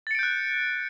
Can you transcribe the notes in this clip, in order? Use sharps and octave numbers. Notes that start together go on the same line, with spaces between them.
F#6 G6 A6 C#7 D7